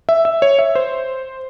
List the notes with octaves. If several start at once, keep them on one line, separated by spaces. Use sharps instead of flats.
E5
E5
C#5
E5
C5